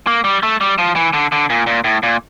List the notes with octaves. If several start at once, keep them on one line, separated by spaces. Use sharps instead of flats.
A#3
G3
A3
G3
F3
E3
D3
D3
A#2
A#2
A2
A#2